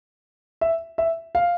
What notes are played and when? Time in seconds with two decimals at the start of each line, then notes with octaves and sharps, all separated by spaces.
0.61 E5
0.98 E5
1.35 F5